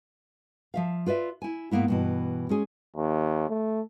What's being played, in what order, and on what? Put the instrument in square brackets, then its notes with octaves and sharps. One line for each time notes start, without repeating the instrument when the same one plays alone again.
[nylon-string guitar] F3 E5 F5
F4 B4 D5 E5
E4 G#5
G#2 D#3 A#3 B3 E4
G2 B2 E3
G#3 C#4 G#4
[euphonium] D#2
A3